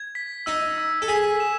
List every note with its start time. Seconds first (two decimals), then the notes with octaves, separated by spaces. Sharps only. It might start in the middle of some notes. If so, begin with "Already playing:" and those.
Already playing: G#6
0.15 B6
0.46 D#4 E6
0.78 E6
1.02 A4
1.08 G#4 B6
1.40 E7